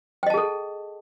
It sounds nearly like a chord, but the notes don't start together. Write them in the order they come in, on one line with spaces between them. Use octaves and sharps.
G5 D#5 A5 G#4 A4